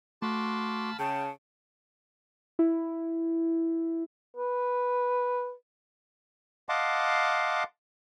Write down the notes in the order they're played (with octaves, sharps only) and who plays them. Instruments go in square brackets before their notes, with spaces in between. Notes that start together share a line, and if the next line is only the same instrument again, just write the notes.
[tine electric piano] A3 [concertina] F#4 C6 D6 [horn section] F5 A5 B5
[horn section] C#3 [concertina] G5 [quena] A5
[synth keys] E4
[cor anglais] B4
[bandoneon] D#5 F5 F#5 A5 C6 D6